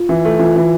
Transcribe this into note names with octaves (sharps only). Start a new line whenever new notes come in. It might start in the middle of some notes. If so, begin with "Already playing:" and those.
Already playing: F4
E3
A3
E3 F4
E3